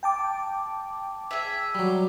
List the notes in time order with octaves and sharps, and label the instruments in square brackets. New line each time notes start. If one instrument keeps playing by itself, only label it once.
[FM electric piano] G5 A5 D6
[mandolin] G#4 E5
[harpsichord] F#3 G3